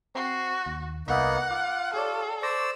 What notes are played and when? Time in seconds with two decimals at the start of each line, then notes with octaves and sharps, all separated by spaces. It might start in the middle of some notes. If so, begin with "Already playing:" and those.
0.15 C4 F#4 C7
0.66 D#2
1.08 C2 A#3 B3 D#4 E5 F#5
1.51 F4 D6
1.94 G4 A4 C#5 D5
2.42 C5 D5 C#6 E6 A#6